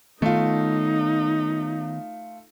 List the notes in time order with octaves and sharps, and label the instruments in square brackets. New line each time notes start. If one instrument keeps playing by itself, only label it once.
[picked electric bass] D#3 B3 [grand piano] A3 F4 [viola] D#4